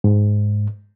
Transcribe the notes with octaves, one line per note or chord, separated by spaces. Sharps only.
G#2